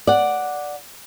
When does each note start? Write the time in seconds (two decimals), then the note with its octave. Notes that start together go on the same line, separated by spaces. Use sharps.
0.07 D5 F#5